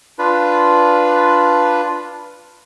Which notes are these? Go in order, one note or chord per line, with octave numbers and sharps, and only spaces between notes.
D4 F4 B4